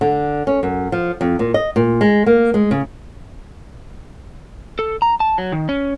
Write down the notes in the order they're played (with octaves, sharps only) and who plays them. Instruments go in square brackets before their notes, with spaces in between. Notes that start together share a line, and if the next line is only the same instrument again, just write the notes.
[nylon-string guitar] D3
C#4
F#2
F3
F2
A#2
D#5
A#2
G#3
A#3
G#3
C#3
[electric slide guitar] A4
A#5
A5
F#3
D#3
C#4